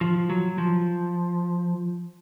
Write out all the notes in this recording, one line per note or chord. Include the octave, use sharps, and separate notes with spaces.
F3
F#3
F3